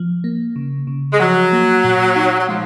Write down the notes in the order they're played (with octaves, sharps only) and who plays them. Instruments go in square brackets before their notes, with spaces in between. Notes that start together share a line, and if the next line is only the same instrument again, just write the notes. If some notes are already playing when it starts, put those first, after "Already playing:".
Already playing: [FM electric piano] F3
A#3
C#3
C#3
[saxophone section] G#3
[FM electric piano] F3 [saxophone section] F#3
[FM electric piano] A#3
A#2
D#4
[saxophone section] F#3
[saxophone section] F3 [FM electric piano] G#3